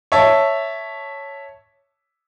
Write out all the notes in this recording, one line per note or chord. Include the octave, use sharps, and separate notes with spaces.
C#5 E5 A5